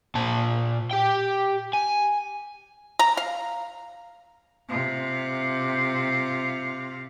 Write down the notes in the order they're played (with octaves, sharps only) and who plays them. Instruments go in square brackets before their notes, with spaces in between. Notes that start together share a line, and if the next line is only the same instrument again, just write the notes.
[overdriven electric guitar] A#2 A5
G4 G5
G#5
[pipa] A#5
F5
[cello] C3 F4